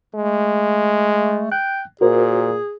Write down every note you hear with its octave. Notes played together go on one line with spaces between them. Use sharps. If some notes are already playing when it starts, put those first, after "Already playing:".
G#3 A3
G5 F#6
A#2 F#4 G#4 A#4 C5